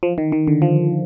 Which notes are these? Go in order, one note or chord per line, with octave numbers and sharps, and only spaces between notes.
F3
D#3
D#3
D3
F3